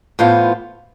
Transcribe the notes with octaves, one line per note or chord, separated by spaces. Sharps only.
A2 E3 B3 F4 C5